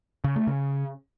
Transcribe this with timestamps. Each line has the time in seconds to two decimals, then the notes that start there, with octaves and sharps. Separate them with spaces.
0.24 C#3
0.36 A3
0.47 C#3